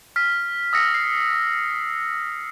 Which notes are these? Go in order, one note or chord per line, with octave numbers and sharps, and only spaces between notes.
F6 B6
D#6 E6 A#6 C#7
C7